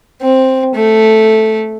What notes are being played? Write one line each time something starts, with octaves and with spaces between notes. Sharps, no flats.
C4
A3